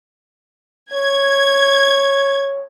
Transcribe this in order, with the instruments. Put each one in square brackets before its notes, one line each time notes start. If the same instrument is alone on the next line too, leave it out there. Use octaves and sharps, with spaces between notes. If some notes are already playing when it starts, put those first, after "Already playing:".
[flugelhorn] C#5 [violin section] G#6